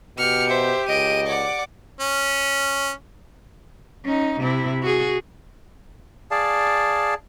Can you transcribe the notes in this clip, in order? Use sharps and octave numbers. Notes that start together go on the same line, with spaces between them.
B2 G4 F6 C#7
C5 E5
C#2 D#5 D7 D#7
D5 F#5 D6
C#4
C#4 D#4
C3 E4
F#4 G#4
G#4 D5 F5 A5